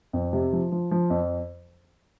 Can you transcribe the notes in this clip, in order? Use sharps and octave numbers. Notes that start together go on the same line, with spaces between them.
F2
C3
F3
F3
F3
F2